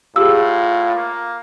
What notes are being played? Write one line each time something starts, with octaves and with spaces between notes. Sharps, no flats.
A2 F4 G4 G#4 E6
A#3